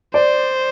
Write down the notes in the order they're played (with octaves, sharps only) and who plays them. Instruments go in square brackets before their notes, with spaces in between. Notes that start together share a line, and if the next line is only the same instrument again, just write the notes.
[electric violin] C5 [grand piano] D5